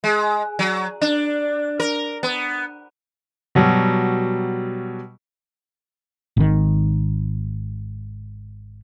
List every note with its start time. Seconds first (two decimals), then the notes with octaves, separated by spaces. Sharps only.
0.04 G#3
0.59 F#3
1.01 D4
1.80 A#4
2.23 B3
3.55 B2 F#3 G3
6.37 G#1 D#3